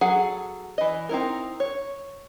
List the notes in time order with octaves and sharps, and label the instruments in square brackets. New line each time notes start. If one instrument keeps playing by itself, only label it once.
[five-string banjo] F#3 G#4 A4 F#5
E3 D#5
C4 D#4 E4 A#4
C#5